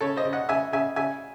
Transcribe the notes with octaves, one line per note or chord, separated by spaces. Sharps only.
C#3 A4 C#5
C5 D#5
C#3
D#5 F#5
C#3 E5 G#5
C#3 E5 G#5
C#3 E5 G#5